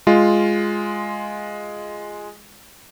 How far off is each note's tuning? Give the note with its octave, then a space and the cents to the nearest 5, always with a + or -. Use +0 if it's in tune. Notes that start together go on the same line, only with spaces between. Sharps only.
G#3 +0 F4 +0